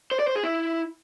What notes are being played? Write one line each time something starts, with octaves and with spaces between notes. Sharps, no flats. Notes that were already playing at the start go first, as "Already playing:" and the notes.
C5
D5
C5
G#4
E4